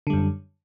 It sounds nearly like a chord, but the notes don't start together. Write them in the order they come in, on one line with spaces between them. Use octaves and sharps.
D3 G3 F#2